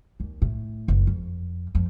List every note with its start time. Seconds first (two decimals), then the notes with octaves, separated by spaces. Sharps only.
0.20 D#2
0.42 A2
0.88 F#1
1.07 F2
1.75 F2